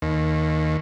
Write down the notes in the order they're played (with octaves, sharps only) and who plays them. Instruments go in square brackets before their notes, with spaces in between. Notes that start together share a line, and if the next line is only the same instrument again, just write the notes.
[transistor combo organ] D#2